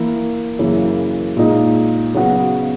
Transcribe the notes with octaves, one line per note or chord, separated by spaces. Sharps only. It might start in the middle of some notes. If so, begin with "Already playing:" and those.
Already playing: E3 A#3 E4
F#2 C#3 E3 A#3 E4
A#2 G#3 D#4
C#3 F#3 B3 F#4